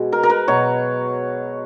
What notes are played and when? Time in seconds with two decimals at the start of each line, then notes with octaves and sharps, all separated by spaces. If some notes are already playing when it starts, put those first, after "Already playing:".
Already playing: B2 G#3
0.12 A#4
0.23 A#4
0.30 B4
0.48 B2 F#3 C#5